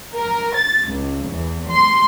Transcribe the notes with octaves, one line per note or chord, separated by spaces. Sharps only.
A#4
A6
C#2
E2
C6